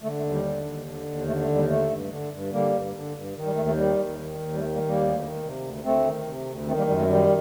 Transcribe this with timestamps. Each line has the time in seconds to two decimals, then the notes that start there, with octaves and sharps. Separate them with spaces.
0.03 D3 A3
0.17 A3
0.23 D#2
0.31 G3
0.44 D3
0.65 D#2
0.85 D3
1.06 D#2
1.27 D3 A3
1.41 A3
1.48 D#2
1.55 G3
1.69 D3 A3
1.90 G2
2.10 D3
2.31 G2
2.52 D3 G3 A#3
2.73 G2
2.94 D3
3.14 G2
3.35 D#3
3.46 G3
3.56 D#2 A3
3.66 A3
3.77 D#3 G3
3.97 D#2
4.18 D#3
4.39 D#2
4.54 G3
4.59 D#3 A3
4.73 G3 A#3
4.81 D#2
4.87 G3 A#3
5.01 D2
5.22 D#3
5.43 C3
5.63 D2
5.84 D2 A3 C4
6.05 D#3
6.26 C3
6.46 D2
6.67 D#3 A3 C4
6.77 G3 A#3
6.87 F#2 G3
6.99 A3
7.08 D#3 G3